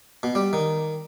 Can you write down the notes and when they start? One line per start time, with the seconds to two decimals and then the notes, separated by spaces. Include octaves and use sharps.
0.23 B2
0.35 G3
0.53 D#3